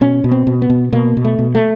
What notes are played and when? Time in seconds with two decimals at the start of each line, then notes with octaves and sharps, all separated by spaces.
0.01 B2 C#4
0.24 B2
0.31 C4
0.47 B2
0.62 B3
0.70 B2
0.93 B2 A#3
1.17 B2
1.25 A3
1.39 B2
1.55 A3